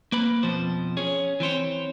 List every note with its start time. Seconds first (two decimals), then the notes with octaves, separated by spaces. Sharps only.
0.12 A#3 B4 B5
0.43 F2 B2 F3 C5
0.97 C#4 G#4 C#5
1.40 E3 C4 C5 C#5